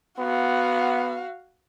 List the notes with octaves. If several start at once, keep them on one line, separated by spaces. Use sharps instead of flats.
B3 F#4 F5